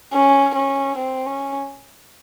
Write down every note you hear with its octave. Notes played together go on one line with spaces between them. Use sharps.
C#4
C#4
C4
C#4